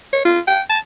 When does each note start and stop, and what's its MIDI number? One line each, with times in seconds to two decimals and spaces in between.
0.13 0.20 73
0.25 0.39 65
0.47 0.61 79
0.69 0.78 81